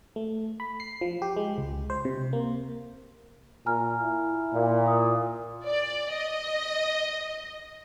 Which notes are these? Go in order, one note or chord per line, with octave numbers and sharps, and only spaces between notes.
A3
B5
C7
F3
G4
G#3
C#2
C5
C3
A#3
A#2 G#5 A#5 F6
E4
A#2
D#6
D5
D#5